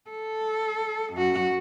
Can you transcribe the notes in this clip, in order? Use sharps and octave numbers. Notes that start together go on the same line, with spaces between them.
A4
F#2 F#4